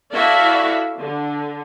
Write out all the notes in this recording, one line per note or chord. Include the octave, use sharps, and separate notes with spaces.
E4 F#4 A4 D5 E5 F5
D3